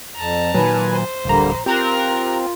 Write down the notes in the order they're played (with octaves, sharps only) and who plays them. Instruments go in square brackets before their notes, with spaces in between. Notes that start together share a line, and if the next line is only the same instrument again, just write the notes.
[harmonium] F2 [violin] A5 A#5
[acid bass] A#2 [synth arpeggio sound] D#3 F#3 [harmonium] B4 G#5
[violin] C5
[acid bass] D1 [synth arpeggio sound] A#1 A#5 [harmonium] D3 G3 A#3
[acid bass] C4 [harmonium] F4 [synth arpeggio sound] G4 A#5 F#6 [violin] A#4